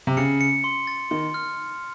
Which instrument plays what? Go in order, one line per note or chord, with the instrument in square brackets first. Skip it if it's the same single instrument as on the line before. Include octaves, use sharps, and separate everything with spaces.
[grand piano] C3
[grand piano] C#3 [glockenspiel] C#7
[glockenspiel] C#7
C6
A6
[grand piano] D#3 [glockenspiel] C6
[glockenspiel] F6